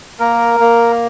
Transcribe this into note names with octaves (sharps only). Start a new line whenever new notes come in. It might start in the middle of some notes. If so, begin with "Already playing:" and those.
A#3 A#4
A#3